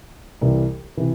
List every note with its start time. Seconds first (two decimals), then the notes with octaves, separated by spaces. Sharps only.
0.41 C2 C3 E3
0.97 C3 E3